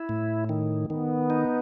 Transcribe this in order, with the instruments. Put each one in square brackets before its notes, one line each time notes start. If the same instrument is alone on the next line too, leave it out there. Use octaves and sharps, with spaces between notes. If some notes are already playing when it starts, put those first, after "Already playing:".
Already playing: [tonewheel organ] E4
A2
D#3
[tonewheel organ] D#3 [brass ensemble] B3
[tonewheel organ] D#4